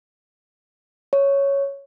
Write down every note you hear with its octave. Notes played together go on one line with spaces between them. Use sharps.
C#5